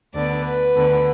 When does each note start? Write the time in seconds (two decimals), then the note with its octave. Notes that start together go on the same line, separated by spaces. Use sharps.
0.13 D2 D3 B3 D5
0.44 B4
0.75 D2 D3 B3